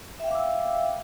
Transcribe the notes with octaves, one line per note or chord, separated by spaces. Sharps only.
E5 F5 G5 D6 E6